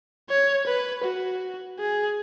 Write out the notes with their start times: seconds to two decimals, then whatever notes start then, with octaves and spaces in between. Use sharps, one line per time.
0.30 C#5
0.66 B4
1.04 F#4
1.79 G#4